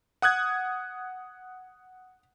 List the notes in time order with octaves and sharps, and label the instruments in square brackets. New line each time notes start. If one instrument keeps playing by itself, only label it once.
[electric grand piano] F#5 D#6 F#6 G#6